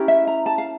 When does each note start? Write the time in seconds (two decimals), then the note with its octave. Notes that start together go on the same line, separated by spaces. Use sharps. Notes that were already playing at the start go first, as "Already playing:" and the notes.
Already playing: C#4 E4 G4 A#4
0.08 E5
0.27 A#5
0.46 A5
0.58 F5